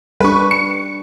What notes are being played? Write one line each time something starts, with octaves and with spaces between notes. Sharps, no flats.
G3 D4 B4 C#6
C#7